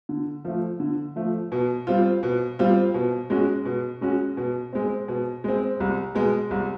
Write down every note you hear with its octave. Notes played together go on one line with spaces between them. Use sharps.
D3
F3 A3
D3
F3 A3
B2
G3 C4 F4
B2
G3 C4 F4
B2
G#3 C#4 F#4
B2
G#3 C#4 F#4
B2
G#3 C4
B2
G#3 C4
C2
B2 G#3
C2